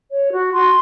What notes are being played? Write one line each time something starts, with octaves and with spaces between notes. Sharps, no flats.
C#5
F#4
F#4 C6